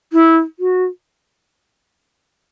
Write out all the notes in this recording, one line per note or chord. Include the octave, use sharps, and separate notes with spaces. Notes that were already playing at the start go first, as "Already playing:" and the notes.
E4
F#4